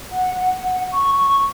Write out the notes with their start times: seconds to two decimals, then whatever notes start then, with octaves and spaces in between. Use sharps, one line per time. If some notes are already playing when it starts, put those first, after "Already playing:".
0.12 F#5
0.39 F#5
0.65 F#5
0.92 C#6
1.17 C#6